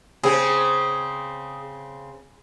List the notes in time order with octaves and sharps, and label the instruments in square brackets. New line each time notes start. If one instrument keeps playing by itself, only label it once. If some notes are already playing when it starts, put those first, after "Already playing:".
[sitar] C#3 C4 [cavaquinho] G#4